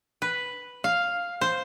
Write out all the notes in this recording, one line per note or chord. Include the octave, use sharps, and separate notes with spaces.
B4
F5
C5